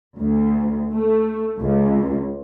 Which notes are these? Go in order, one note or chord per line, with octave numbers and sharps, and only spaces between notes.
D2
A3
C#2